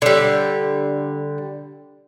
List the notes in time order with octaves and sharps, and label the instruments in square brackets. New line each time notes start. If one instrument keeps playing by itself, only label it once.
[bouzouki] D3 G3